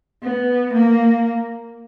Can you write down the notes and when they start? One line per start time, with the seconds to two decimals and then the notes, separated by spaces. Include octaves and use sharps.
0.23 B3
0.73 A#3